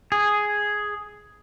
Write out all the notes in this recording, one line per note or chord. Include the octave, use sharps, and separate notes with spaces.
G#4